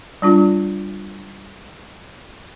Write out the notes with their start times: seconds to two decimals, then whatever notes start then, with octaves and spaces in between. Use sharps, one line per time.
0.22 G3 D4 F4